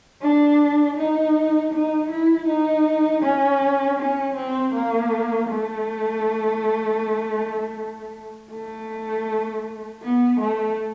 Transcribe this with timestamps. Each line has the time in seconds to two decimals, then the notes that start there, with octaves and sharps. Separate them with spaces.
0.22 D4
0.97 D#4
1.72 D#4
2.10 E4
2.48 D#4
3.23 C#4
3.99 C#4
4.36 C4
4.74 A#3
5.49 A3
8.52 A3
10.02 B3
10.40 A3